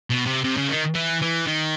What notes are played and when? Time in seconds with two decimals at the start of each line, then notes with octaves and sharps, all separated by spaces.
0.10 B2
0.26 C3
0.44 C3
0.57 C#3
0.69 D#3
0.95 E3
1.21 E3
1.47 D#3